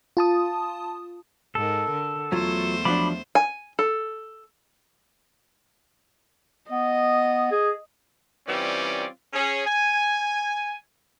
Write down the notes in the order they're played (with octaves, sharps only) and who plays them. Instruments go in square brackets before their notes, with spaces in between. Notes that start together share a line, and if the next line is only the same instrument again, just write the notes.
[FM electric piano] F4 A5 D#6
[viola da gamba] G#2 A#4 [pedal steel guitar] A4
[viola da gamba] D3
[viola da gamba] E2 A3 C5 [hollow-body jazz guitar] F#3 F4
[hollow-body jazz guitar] F3 F#3 D4 [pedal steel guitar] B5 D6
[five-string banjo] G#5
A4
[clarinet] B3 [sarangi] D#5
[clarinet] G#4
[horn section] E3 G3 C4 C#4 F4 D5
C#4 G#4
G#5